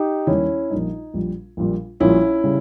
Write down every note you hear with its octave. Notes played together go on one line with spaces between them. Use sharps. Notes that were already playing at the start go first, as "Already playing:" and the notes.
Already playing: D#4 G4
D#2 D#3 G3 C#4 E4
A#1 A#2 G3 D#4
A#1 A#2 G3
A#1 A#2 G3
A#1 A#2 G3 C#4 E4
C#3 G3